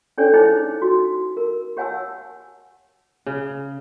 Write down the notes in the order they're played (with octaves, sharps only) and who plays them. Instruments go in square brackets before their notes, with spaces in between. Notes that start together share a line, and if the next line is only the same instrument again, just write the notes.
[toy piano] C#4 D4 A4 C#5 D5
D#4 E4 G#4 A4 C5 C#5
F#4
A#4
G4 C#5 F#5 G#5 A5 E6
[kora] C#3